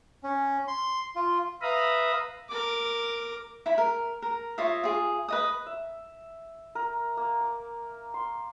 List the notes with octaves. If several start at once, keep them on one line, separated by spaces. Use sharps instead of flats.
C#4
C6
F4
B4 E5 F5 A#5 B5 D#6
A#4 D6
E4 B5
A#4
A#4
F4 C#5 D#5 E5
F4 G#4
B4 D#5 D#6
E5
A#4
A#3
D6
C6